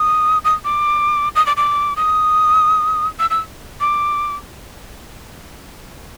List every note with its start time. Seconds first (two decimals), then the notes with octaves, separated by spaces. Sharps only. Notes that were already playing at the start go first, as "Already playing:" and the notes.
Already playing: D#6
0.45 D#6
0.65 D6
1.35 D#6
1.46 D6
1.57 D6
1.96 D#6
3.19 E6
3.30 E6
3.81 D6